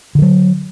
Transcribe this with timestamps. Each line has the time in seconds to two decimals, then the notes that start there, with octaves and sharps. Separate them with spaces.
0.15 D3
0.19 D#3
0.22 F#3